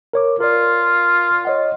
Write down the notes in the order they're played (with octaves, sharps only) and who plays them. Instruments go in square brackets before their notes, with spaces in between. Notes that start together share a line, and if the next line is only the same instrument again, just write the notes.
[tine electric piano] A#4 C#5 D6
[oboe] F4 [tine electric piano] A#4 D5
[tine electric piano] C#5 D#5 F#5